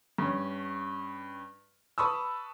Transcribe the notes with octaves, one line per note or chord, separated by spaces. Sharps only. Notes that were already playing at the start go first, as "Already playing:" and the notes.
G2 C#4
B4 A5 B5 C#6 D#6 E6